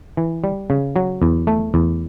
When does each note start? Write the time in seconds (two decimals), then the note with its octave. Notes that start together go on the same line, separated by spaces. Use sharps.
0.17 E3
0.44 G3
0.70 C#3
0.96 F#3
1.22 E2
1.47 A3
1.74 E2